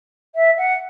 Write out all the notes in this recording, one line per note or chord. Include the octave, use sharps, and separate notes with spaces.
E5
F#5